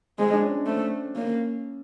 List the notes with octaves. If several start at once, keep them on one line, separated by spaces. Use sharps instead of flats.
G#3 C4
D4
C#4
A3 C4
A#3 C#4